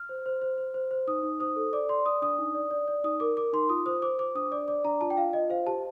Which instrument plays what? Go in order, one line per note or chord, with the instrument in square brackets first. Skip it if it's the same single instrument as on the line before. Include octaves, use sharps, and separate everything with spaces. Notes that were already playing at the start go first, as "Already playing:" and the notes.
Already playing: [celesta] F6
C5
C5
C5
C5
C5
C5
D#4 D#6
D#4
C5 D#6
A4
D5 D6
D5 C6
D5 D#6
D4 D#6
D#4
D5
D5
D5
D#4 D#6
A#4 D6
A#4 D6
D#4 C6
F4 D#6
C5 D#6
C5 D6
C5 D6
D4 D#6
D5 D6
D5 D6
D4 A#5
F4 A5
G5
F4 F5
F4 D#5
C5 F5
G4 A5